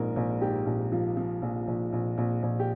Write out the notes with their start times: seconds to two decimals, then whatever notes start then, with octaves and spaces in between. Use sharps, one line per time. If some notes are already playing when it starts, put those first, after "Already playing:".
Already playing: A#1 G#2 A#4
0.16 A#1
0.41 G#2 G4
0.66 A#1
0.92 F3
1.17 F3
1.42 A#1
1.67 A#1
1.93 A#1
2.18 A#1
2.43 A#1
2.59 G4